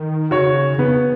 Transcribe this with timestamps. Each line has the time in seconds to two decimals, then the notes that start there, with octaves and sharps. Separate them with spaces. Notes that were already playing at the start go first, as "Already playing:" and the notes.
Already playing: D#3
0.31 C#3 F#4 C#5
0.78 C#3 B3